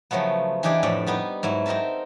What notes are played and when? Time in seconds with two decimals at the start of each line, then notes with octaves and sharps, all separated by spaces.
0.11 C#3 F3 F#3 A3 B3
0.63 E3 D4 D#4 G4 G#4 D5
0.83 F2 A2 D5 E5
1.07 G3 B3 D#4
1.43 G#2 F#3 E4
1.66 C4 D#4 A#4 E5 A5